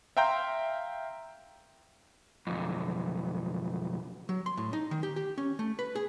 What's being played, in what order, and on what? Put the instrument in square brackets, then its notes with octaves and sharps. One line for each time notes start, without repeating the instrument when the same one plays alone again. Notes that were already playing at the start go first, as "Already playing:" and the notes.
[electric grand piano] E5 F5 G5 A#5 C6 G6
[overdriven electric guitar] B1 F2
[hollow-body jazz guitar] F#3
C6
A2
D#4
D#3
G4
G4
C#4
A3
B4
G#4